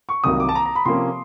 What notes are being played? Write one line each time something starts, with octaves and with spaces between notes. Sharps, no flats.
C#6
C2 C3 D#3 F#3 A#3 D#6
D6
A5
A#5
A#5
B5
C3 F3 A#3 C#4 C6